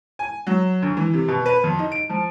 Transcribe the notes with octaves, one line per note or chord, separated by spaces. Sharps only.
G#5
F#3
D2
E3
C3
B2
B4
F2
D#4
D7
F3